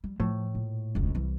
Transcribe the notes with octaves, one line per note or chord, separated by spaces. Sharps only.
G3
A2 F3
A#2
E1 C#2
C2 E3